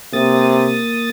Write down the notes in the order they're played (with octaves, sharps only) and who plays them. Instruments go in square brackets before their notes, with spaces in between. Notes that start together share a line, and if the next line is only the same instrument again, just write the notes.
[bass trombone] C3 [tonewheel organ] A#3 D#6 A6